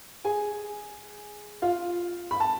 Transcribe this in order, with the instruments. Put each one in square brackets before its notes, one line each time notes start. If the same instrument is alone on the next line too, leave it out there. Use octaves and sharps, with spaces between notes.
[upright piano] G#4 G#5
F4 F5
B5
A5